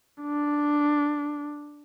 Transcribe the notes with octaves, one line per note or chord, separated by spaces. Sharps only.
D4